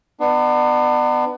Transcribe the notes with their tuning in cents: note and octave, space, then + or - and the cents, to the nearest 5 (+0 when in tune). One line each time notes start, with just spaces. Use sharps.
B3 +10 D4 +40